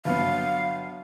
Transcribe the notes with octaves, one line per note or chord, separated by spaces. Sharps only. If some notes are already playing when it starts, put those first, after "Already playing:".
G1 F#3 B3 F5